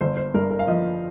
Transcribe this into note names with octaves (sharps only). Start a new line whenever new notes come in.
G1 C5
C5
G2 A#4
A#4
F5
F3 D#5